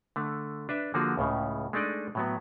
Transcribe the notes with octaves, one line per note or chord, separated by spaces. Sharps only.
D3 A3
D4 B4 E5
D3 F3 A#3 F#4 G#4
C#2 A2 C#3
G#3 A3 D4 D#4 D5 D#5
A2 F#3 B3